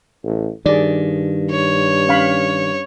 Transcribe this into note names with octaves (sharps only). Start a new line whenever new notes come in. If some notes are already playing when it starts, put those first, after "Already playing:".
A1
G2 D#3 G#4 D5
C#5
C#4 F5 B5